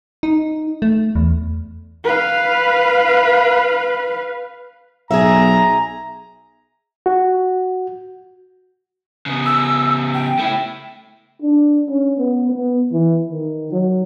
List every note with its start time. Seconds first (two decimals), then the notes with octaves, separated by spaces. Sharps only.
0.23 D#4
0.82 A3
1.15 E2
2.04 B4 F5
5.11 B1 G#4 E5 A#5
7.06 F#4
9.26 C#3 B3
9.46 E6
10.14 G5
10.39 A3 E4
11.42 D4
11.88 C#4
12.18 B3
12.50 B3
12.93 E3
13.29 D#3
13.72 F#3